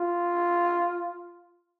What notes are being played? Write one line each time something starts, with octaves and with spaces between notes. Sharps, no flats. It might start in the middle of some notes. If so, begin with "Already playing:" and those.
Already playing: F4